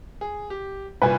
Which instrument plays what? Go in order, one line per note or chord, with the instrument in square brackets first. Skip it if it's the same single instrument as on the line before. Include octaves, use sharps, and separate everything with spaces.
[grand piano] G#4
G4
[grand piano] C2 G2 A#2 [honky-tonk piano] B4 G#5